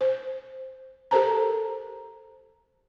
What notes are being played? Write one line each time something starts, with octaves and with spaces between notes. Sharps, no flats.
C5
G4 A4 A#4 C5 A5 A#5